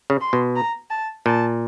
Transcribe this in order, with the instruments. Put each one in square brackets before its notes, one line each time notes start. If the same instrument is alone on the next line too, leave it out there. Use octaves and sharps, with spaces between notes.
[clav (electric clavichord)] C#3
[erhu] C6
[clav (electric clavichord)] B2
[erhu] A#5
A5
[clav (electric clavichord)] A#2 [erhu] A5